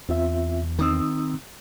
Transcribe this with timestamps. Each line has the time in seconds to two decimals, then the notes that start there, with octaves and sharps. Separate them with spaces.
0.09 E2 C4 F4 E5
0.79 D#3 C4 D#4 D#6 E6